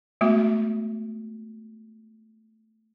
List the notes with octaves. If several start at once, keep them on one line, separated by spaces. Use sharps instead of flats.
G#3 A3 B3 F#4